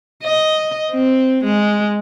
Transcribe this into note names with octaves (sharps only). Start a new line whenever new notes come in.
D#5
C4
G#3